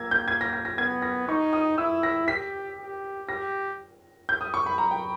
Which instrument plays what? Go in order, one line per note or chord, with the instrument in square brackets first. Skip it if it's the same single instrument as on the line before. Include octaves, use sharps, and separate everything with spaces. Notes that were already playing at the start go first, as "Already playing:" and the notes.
Already playing: [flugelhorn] A#3 [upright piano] E6 G#6 A#6
[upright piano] G6
G#6
A#6
A#6
A#6
[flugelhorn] B3 [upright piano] G#6
[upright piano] A#6
[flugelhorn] D#4 [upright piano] C#6
[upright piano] D#6
[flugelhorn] E4 [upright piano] E6
[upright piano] A#6
[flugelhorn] G4 [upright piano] B6
[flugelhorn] G4
[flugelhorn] G4 [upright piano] A#6
[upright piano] G6
D#6
C#6
B5
A#5
G5